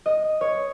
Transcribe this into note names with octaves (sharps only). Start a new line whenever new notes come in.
D#5
C#5